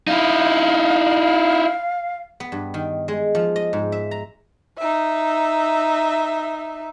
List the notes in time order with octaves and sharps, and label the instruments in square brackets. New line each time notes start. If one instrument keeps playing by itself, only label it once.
[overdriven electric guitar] D#4 E4 [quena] F5
[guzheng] B3
G2
D#3
G#3
F3
D#5
G#2
E5
A#5
[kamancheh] D#4 E5